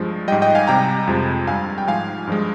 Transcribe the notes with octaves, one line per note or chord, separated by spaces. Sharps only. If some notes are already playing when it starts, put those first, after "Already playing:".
Already playing: G2 F3 G#3
G#2 G3 D#5 G5
D#5 G5
F5 G#5
C3 G3 G5 A#5
F2 C3 F3 G#3
G2 G3 F5 G#5
G5
G#2 F3 G#3 F5 G#5
G2 F3 G#3